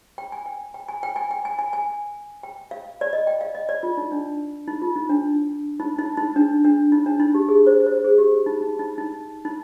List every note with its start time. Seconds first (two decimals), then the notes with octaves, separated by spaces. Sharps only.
0.18 G5
0.32 G#5
0.46 G5
0.74 G5
0.88 G#5
1.03 G5
1.16 G#5
1.31 G5
1.45 G#5
1.59 G#5
1.73 G#5
2.43 G5
2.71 F5
3.01 D5
3.13 D#5
3.27 G5
3.41 F5
3.55 D#5
3.69 D5
3.83 F4
3.97 D#4
4.12 D4
4.68 D#4
4.82 F4
4.96 D#4
5.09 D4
5.80 D#4
5.99 D#4
6.17 D#4
6.36 D4
6.64 D4
6.92 D#4
7.06 D4
7.20 D#4
7.35 G4
7.49 G#4
7.67 C5
7.86 C5
8.04 G#4
8.18 G4
8.46 D#4
8.61 D#4
8.79 D#4
8.98 D#4
9.45 D#4